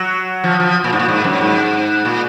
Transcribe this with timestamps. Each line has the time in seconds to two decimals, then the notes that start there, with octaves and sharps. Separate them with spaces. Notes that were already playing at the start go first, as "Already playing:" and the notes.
Already playing: F#3
0.44 F3
0.60 F3
0.84 A#2
0.93 G#2
0.99 A#2
1.08 G#2
1.24 F#2
1.41 G#2
2.05 A#2